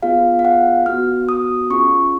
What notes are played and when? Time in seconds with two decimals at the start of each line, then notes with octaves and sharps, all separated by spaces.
0.03 B3 F4 G#4 F5
0.39 F5
0.45 F#5
0.86 B3 F#4 F6
1.29 D#6
1.70 C#4 F4 G#4 C#6